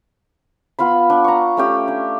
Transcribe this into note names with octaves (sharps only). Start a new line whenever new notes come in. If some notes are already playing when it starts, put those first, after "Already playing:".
B3 F4 F5 B5
D4
A#5 C#6
A3 C#4 G4
D4